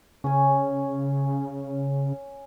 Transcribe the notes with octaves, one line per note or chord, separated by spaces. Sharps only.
C#3 C#4 G#5